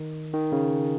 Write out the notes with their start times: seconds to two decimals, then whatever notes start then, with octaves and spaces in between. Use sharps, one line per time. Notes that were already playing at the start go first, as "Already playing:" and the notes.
Already playing: D#3
0.34 D#3
0.52 C#3